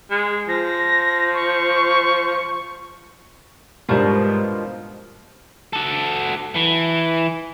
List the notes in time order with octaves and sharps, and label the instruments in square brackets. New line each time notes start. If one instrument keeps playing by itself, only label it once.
[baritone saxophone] G#3
[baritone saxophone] F3 [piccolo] A#6
[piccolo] C#6
[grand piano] G#2 G3 D4 [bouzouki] B2 D#3 F3
[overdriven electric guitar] F#4 A4
E3